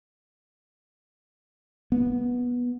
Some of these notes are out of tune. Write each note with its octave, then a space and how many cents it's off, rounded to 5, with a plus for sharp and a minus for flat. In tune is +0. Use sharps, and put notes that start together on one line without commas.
B3 -15